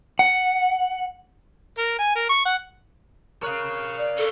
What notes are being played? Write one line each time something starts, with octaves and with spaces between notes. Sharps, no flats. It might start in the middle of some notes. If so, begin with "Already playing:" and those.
F#5
A#4
G#5
A#4
C#6
F#5
A#4 C#5 F5 F#6
D5
A4